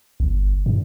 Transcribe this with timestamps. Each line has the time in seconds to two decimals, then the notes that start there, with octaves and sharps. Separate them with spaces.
0.20 G1
0.66 G2